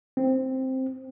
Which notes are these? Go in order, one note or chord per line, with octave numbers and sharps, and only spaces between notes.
C4